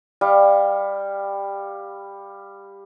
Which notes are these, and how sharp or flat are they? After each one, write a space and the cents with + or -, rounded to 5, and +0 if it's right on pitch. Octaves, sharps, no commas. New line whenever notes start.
G3 +15 F5 +15